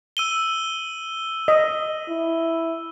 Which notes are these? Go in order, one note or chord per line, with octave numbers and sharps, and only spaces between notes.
E6 D#7 G7
D#5
E4